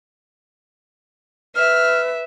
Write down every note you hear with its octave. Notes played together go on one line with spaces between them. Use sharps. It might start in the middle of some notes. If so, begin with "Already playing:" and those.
B4 E5 F6